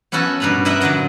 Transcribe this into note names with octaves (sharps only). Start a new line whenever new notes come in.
B3 C#4 E4 F#4 A4 B4
G2 B2 B4 A#5 B5
E4 A#4 B4 D#5 E5 F#5
A#2 D3 F#3 D#5 F#5